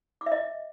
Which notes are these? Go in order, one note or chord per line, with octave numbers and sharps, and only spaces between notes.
D6
E5
D#5